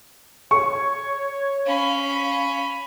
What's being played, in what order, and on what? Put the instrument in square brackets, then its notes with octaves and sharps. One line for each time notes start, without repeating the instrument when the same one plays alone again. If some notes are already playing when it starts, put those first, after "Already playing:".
[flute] C#5 [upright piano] C#6
[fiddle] C#4 B5 [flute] F5